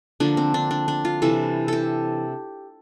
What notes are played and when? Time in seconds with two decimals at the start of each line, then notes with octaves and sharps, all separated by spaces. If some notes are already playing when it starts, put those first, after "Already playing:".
0.20 D3 F3 A#3 D4
0.37 C4
0.54 D4
0.71 D4
0.88 D4
1.05 F4
1.22 C3 E3 G3 A4
1.68 G4 A4